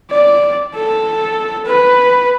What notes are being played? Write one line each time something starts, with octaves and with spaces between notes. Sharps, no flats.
D5
A4
B4